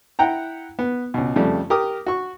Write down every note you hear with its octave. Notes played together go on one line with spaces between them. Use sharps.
E4 F#5 G5 A#5
B3
C#2 B2
F2 C#3 G3 A3
G4 A#4 D6 D#6
F#4 C#6